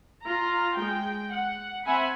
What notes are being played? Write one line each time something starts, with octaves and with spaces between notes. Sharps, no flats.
F4 A#5
G#3 G5
F#5
C4 E5 F#5 G#5 B5